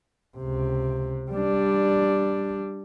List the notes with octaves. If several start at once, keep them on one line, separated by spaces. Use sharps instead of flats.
C#2 C3
G3 D4